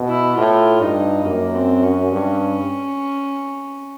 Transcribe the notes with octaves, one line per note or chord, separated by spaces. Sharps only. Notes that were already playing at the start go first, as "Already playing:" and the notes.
Already playing: B2
E4
A2 F4
G2 D#4
F#2 A#3
C4
C#4
G2